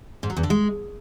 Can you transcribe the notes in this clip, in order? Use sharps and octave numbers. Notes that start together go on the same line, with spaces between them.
G#2
F#3
E2
D3
G#3